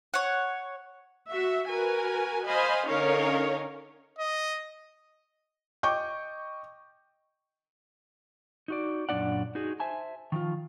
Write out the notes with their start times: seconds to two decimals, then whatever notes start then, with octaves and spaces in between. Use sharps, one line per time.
0.14 C#5 F#5
1.30 F#4 E5
1.68 F#4 A#4 B4 G#5
2.48 C5 D#5 F5 G#5 B5
2.88 D3 C#4 D#4 A#4 C#5 F5
4.19 D#5
5.83 D#5 G5 C#6 D6 G6
8.68 D#4 F#4 D5
9.09 F#2 A#2 A3 D4 D5 F#5
9.55 D#4 F#4 G#4
9.80 C5 E5 G#5 A5
10.32 D#3 F3 F4